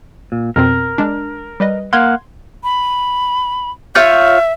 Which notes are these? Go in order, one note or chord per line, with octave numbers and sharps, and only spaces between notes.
A#2
F2 B2 C4 A#4
G#3 D4
G3 B4 D#5
A#3 F5 F#5 C6 G#6
B5
F4 C#5 E5 G6